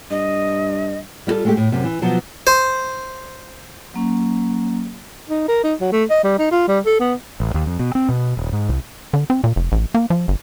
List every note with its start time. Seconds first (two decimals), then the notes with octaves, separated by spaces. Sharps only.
0.11 G2 D#5
1.27 G3 E4 F4 A4
1.45 G#3 A3 G4
1.57 A2
1.72 F#2 C3
1.84 E3
2.02 B2 F3 F#3
2.47 C5
3.94 F#3 A#3 C#4
5.29 D#4
5.48 A#4
5.64 D#4
5.81 F#3
5.92 A3
6.10 D#5
6.24 G3
6.39 D#4
6.52 F4
6.68 G3
6.86 A4
7.00 B3
7.40 A1
7.54 D#2
7.66 F2
7.79 B2
7.95 C4
8.09 B2
8.37 D#1
8.53 G#2
8.69 C2
9.13 D3
9.30 C4
9.44 A#2
9.56 F1
9.72 A1
9.94 A#3
10.10 F3
10.28 G1